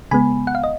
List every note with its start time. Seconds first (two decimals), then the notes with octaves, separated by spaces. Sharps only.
0.11 C#3 G#3 B3 G#5 B5
0.47 F#5
0.55 F5
0.64 D#5